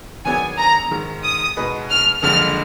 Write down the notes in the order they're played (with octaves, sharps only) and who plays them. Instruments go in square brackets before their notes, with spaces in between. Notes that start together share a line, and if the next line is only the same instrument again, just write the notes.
[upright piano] D#3 F#3 B3 D4 G#4 [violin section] G#5
[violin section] A#5
[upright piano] G#2 D#3 G#3
[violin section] D#6
[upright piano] B2 G#3 D#4 G#4 B4
[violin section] F6
[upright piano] F#1 F2 D3 G#3 [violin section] F6